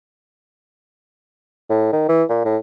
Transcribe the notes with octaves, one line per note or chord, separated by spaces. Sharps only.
A2
D#3
E3
A#2
A2